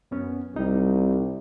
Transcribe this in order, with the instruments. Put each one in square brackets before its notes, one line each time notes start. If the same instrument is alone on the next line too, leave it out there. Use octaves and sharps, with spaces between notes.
[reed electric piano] F#2 B3 C#4
[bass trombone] C2 [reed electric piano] G3 D#4